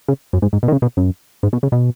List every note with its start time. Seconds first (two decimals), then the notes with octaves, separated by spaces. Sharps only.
0.08 C#3
0.33 F#2
0.42 G#2
0.53 G#2
0.63 B2
0.68 D#3
0.72 C#3
0.82 B2
0.97 F#2
1.43 G#2
1.53 B2
1.63 C#3
1.72 B2